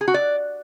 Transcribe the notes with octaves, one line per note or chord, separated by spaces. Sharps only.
G#4
F#4
D5